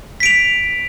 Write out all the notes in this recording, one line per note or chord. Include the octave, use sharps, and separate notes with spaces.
B6 D7 F7